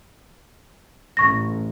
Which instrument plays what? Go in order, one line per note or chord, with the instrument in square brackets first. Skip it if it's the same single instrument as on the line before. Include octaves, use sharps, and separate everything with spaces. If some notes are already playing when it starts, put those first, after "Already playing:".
[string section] A1 [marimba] C#6 A#6